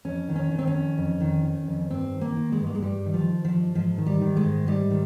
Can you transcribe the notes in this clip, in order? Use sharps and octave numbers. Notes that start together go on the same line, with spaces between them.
F2 C#4
D#3
C#4
D#3
C4
C#4
F2
F2
D#3
D#3
F2
G2 C4
D#3
A#3
D#3
G#3
G2
A#3
G#3
G2 G3
D#3
F3
D#3
F3
G2
G#2 F3
D#3
G3
D#3
G#3
G#2
G#2 G3
D#3